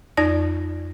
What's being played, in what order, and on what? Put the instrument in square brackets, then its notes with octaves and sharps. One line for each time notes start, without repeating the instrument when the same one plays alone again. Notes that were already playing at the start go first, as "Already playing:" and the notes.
[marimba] F2 D#4 D5 A#6